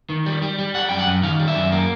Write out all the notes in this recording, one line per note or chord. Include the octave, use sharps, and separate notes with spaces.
D#3
G3
G3
G3
G3 F#5
F#2 G5
F#5
F#2
D#3 F5
G3
E5
F#2
A#3